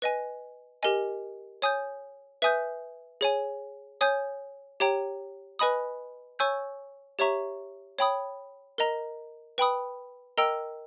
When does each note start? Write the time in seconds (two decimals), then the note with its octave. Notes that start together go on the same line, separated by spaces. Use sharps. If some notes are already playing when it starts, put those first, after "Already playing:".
0.02 B4 D#5 G#5
0.83 G4 A#4 D#5 G#5
1.62 C#5 G#5 D#6 G6
2.42 B4 E5 G#5 D#6 G6
3.21 G#4 C#5 G#5
4.01 C#5 G#5 D#6 G6
4.80 G4 C#5 G5 A#5
5.59 B4 D#5 G#5 B5 D#6
6.39 C#5 G#5 C#6 E6 G6
7.19 G4 C#5 E5 A#5 C#6
7.99 C#5 G5 B5 D#6
8.78 A#4 D#5 A#5
9.58 B4 G5 B5 D#6
10.38 A#4 D#5 G5 A#5 E6